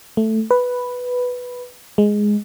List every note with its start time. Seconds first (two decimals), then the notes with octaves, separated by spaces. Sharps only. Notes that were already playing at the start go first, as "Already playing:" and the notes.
0.17 A3
0.51 B4
1.98 G#3